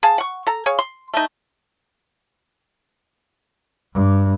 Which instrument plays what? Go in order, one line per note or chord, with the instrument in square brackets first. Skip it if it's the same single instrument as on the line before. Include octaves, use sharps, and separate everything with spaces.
[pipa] G#4 F5 A5
F#5 C#6
A4 A#5
G#4 C#5 F5
C6
A3 D#4
[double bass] G2